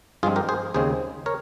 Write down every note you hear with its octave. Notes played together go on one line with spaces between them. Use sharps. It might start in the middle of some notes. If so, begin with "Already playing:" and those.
G2 F3 G#3 C4 F4 G#4
G4 A#4
G#4 C5
D#2 C#3 G#3 C4 G#4 C5
A#4 C#5